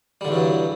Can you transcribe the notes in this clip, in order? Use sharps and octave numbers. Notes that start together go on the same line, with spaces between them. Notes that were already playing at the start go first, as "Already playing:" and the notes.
E2 G2 D3 F#3 G3